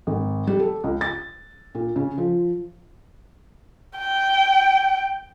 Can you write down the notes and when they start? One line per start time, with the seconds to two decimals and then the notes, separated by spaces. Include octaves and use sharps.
0.07 G#1
0.47 G3
0.60 A4
0.84 C#2
1.01 A6
1.75 A#2
1.96 C#3
2.18 F3
3.98 G5